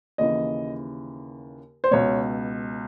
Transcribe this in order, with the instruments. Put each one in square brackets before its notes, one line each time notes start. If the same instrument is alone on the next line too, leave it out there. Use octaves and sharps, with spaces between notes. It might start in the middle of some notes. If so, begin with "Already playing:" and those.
[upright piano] D#2 C#3 E3 D#5
C5
C#2 B2 C#5